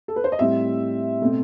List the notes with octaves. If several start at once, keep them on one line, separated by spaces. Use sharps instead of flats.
A4
B4
C5
D#5
A2 G3 C4 E5
B2 A3 C4